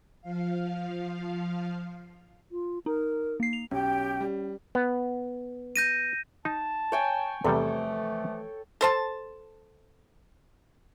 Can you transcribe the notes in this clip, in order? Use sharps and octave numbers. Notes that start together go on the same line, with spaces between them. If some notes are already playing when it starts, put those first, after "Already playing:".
F3 F5
F4
D#4 A#4
A#3 C7
F7
B1 C#4 G4 G5
G3
B3
G6 A#6 D#7
D#4 A5
C#5 G5 G#5
E2 C3 E3 F3 G3 A3 A4
A4 C5 A5